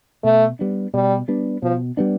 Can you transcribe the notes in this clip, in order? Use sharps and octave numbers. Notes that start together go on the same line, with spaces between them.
B2 A3
G3 B3 D4
B2 G3
G3 B3 D4
B2 F3
G3 B3 D4